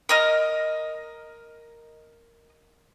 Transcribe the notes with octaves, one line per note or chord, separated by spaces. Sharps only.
A#4 D#5 F6